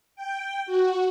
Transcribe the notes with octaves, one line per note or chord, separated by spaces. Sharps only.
G5
F#4